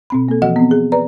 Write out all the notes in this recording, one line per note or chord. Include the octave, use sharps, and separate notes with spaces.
B2 C4 B5
A#3 A4
E3 F3 F#4 D#5 F#5
B3 C4
G#4
B4 D5 A#5